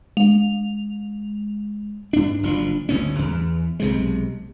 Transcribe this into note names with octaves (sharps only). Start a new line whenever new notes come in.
G#3 F7
G2 D4
F#1 F3 C#4 D4
G1 D2 G2 C#4
E2
B1 C3 G#3